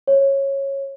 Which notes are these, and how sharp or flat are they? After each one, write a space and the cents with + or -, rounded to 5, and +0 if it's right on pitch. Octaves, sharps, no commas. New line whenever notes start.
C#5 -15